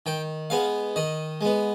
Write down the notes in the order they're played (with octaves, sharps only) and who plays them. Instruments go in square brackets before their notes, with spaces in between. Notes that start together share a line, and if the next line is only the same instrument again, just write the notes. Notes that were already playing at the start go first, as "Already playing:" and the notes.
[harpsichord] D#3 G5
G#3 B3 F5
D#3 D#5
G#3 B3